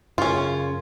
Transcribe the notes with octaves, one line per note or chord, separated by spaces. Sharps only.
F#2 C#3 C#4 F4 C6 C#6